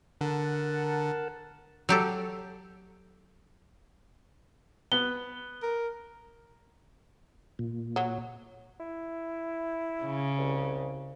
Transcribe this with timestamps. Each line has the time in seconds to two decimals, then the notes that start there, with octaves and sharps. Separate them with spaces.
0.21 D3 A#4 F#5 A5
1.89 F#3 G4 A4
4.92 B3 G7
5.63 A#4
7.59 A#2
7.96 F#3
8.80 E4
10.04 C#3
10.38 C2